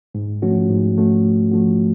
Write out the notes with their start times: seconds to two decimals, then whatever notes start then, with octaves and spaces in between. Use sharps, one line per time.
0.15 G#2
0.42 F3 A3 C#4 F#4
0.69 G#2
0.96 F3 A3 C#4 F#4
1.24 G#2
1.52 F3 A3 C#4 F#4